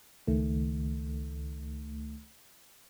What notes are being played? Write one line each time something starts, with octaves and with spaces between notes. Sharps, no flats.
C#2 D#3 A3